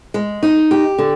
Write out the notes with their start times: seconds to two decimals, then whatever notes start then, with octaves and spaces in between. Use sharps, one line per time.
0.14 G#3
0.43 D#4
0.71 G4
0.98 D3